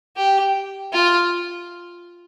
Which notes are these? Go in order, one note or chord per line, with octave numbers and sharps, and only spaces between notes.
G4
F4